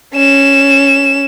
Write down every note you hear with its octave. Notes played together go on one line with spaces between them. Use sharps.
C#4 E7